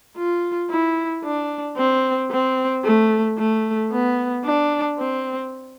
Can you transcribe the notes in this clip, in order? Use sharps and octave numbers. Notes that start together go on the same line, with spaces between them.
F4
E4
D4
C4
C4
A3
A3
B3
D4
C4